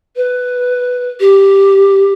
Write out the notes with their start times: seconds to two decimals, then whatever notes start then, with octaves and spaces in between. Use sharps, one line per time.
0.16 B4
1.20 G4